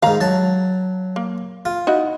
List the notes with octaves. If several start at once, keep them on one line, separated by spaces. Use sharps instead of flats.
G#2 D#3 F5 A#5
F#3 A5
A#3
F4
D#4 E4 F#4